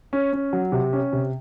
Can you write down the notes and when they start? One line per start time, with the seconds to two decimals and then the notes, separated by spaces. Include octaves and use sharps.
0.13 C#4
0.33 C#4
0.53 F#3
0.72 C3
0.93 C#4
1.13 C3